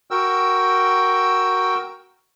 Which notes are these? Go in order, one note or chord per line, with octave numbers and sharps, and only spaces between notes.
F#4 A#4 G5 E6